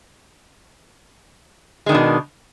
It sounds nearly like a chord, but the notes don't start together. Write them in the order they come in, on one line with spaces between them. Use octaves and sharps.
G#3 D#3 D4 B2